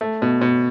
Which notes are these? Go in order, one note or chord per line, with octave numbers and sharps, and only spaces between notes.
A3
B2
B2